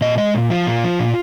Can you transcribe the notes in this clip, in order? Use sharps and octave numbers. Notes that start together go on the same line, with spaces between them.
A#2 D#5
G#3 D#5
A#2
F3 F4
A#2
F3
A#2